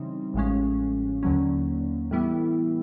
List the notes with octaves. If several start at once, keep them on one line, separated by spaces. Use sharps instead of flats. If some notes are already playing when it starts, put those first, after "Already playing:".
Already playing: C#3 E3 G3 C4 D#4
A1 A2 F3 G#3 C#4
D#2 D3 F#3 A#3 C#4
A2 E3 G3 B3 E4